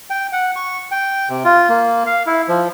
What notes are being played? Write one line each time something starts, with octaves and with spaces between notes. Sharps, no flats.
G5
F#5
C#6
G5
C3
F4
A#3
F5
E4
F3